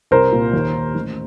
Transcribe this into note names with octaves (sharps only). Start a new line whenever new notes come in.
C2 A#4 C5
A#2
D#2
D#3
A1